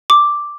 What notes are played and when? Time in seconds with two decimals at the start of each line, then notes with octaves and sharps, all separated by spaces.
0.10 D6